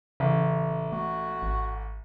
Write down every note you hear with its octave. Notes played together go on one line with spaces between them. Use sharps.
A1 C#3
A3 F#4
G#1